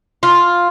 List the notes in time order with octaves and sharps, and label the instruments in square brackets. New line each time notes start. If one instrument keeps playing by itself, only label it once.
[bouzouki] F4